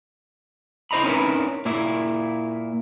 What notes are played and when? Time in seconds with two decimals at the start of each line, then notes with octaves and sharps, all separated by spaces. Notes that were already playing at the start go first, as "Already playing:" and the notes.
0.91 E4 C5 D#5 A#5 B5
1.04 C4 C#4 D#4 E4 A#4 B4
1.65 A#2 A#3 E4